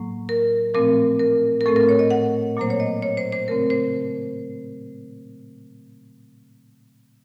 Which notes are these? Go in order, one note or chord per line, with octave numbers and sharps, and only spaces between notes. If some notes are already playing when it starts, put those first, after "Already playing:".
Already playing: A2 F#3 A#3
A#4
A#2 F3 A3 C4 A#4
A#4
A#4
A2 A3 C4 A4
A#4
C#5
D#5
F#5
A#2 F#3 A#3 C5
C#5
D#5
C#5
C5
C5
C#3 A3 C4 A#4
C5